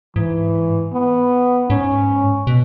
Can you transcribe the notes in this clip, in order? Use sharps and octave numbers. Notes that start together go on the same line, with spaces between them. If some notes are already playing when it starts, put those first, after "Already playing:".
G#2 E3
B3
G#2 C#4
B2